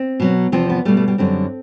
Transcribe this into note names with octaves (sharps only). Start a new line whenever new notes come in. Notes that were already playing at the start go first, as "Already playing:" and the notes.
Already playing: C4
B2 F#3
E2 C3 F3 C4
B3
B2 G3 A3
A3
G3
F#2 D3 G3 C4